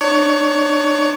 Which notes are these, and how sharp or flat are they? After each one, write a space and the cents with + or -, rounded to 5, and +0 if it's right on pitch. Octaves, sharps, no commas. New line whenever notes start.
D4 +35 C#5 +25